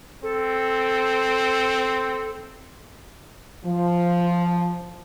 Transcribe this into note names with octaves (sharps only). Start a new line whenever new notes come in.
C4 A4
F3